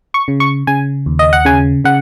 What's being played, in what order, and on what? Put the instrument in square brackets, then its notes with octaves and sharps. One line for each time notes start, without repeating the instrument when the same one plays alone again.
[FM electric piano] C#6
C#3
C#6
C#3 G#5
D#2
D#5
F#5
C#3 G#5
C#3 F#5